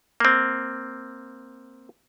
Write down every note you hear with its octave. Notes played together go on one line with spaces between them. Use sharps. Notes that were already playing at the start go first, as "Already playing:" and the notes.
A#3 C4